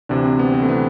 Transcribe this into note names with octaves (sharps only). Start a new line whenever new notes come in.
D2 C3 E3 D4
C4
B3
C4
A3
C3 E3 B3